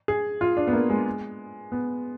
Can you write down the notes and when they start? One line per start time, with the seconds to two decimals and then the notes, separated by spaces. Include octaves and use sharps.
0.08 G#4
0.41 F4
0.57 D4
0.67 B3
0.73 A#3
0.90 G#3
1.72 B3